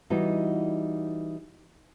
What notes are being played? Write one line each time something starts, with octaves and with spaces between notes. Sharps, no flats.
E3 G3 B3 D#4 F#4